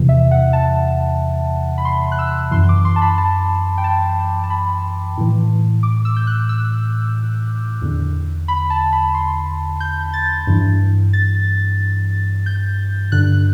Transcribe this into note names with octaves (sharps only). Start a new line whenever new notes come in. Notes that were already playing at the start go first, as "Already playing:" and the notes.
Already playing: E2 C3 E3
E5
F#5
A5
B5
C6
F#6
E6
F#2 E3 C6
D6
C6
A5
B5
A5
G5
A5
A5
B5
A2 E3
D6
E6
G6
F#6
E6
E2 D3
B5
A5
B5
C6
G6
A6
G2 E3
A6
G6
G2 D3 F#6